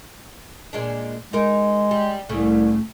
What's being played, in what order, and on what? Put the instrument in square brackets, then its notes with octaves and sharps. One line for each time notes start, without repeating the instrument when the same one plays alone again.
[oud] A#2 G#3 D4
[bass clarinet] G#3 [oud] D#4 A#4
[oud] G3
[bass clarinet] C2 [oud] A2 C#3 A3